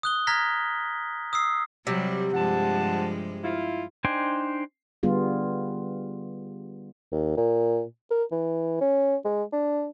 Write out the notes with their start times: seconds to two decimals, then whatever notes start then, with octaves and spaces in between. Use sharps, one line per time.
0.03 D#6 F#6 G7
0.27 A#5 F6 G#6 A#6 B6
1.33 D#6 E6 C7
1.87 C3 F#3 G3
2.33 G2 F3 G#3 F#5 A5
3.44 E4 F4
4.05 D4 D#4 C5 G5 G#5
5.03 D3 G3 B3 F4 G#4
7.12 D#2
7.37 A#2
8.11 A#4
8.32 E3
8.81 C#4
9.25 G#3
9.53 D4